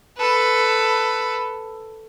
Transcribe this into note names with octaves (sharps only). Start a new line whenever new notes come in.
A4 B4